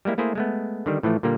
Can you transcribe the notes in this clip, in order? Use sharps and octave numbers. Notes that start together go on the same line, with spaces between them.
G3 G#3 A#3 E4
A3 A#3 E4 G#4 C5
G#3 A3 B3
D3 D#3 G3
A2 E3 F3 A3
A#2 D3 G3 A#3